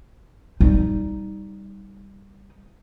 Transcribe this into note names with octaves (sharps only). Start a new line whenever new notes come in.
G3 D#4